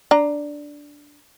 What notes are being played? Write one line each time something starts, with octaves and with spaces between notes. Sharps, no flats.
D4 A#5